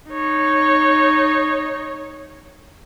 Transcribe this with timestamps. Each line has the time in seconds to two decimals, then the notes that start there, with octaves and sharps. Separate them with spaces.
0.11 D#4 C#5